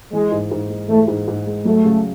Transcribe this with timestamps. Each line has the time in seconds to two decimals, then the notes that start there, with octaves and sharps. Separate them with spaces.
0.13 E3 G#3
0.32 G#2
0.51 G#2
0.70 G#3
0.89 E3 A3
1.08 G#2
1.28 G#2
1.47 G#3
1.65 F#3 A3
1.85 C#3